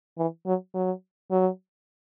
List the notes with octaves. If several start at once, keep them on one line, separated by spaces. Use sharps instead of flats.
E3
F#3
F#3
F#3